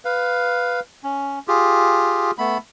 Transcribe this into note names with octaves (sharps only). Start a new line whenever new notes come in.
B4 F5
C#4
F4 G4 G#4
A3 B3 B5